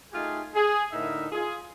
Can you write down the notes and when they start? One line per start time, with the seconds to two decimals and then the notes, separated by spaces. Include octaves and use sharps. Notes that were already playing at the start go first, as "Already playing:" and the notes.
0.13 A3 D#4 F4 G4 G#4
0.55 G#4
0.92 A2 D3 D#4 A#4 E5
1.31 F4 G#4